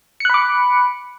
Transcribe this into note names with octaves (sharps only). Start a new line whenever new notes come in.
B5 D6 F#6 C#7